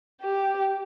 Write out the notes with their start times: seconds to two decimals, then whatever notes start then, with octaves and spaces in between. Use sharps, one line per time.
0.21 G4